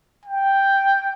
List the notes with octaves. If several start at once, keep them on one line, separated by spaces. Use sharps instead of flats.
G5